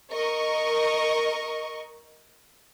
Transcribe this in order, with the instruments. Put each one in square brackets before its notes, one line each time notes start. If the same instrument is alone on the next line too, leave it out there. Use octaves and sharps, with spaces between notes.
[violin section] A#4 D#5 C#6